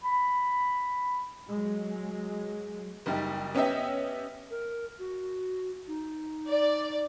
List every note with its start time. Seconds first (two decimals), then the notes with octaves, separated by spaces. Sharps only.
0.04 B5
1.51 F#3 G#3
3.06 F#1 G3 D#4
3.55 B3 C#4 G4 D#5 E5
4.51 A#4
4.99 F#4
5.88 D#4
6.49 D5